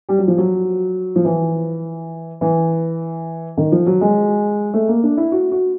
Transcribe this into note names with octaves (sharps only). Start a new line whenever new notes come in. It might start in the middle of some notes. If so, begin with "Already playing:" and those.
G3
F#3
F3
F#3
F3
E3
E3
D#3
F3
F#3
G#3
A3
A#3
D4
E4
F#4
F#4